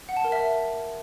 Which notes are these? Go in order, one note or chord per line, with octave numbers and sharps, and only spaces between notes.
F#5
A5
A#4
E5